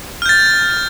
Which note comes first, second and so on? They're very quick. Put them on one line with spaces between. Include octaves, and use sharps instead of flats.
F6 G6 A6